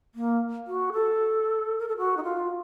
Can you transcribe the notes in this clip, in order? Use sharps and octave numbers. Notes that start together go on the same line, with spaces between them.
A#3
F#4
A4
A#4
A4
F#4
D#4
F4